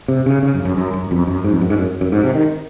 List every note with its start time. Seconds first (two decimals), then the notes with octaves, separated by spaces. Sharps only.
0.08 C3
0.26 C#3
0.43 C#3
0.54 F#2
0.65 F#2
0.77 F#2
0.93 F#2
1.11 F2
1.27 F#2
1.44 G#2
1.53 F2
1.61 F#2
1.70 G#2
1.78 F#2
2.01 F#2
2.12 G#2
2.23 C3
2.35 D#3